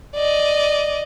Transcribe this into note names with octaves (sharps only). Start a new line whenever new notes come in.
D5 D#5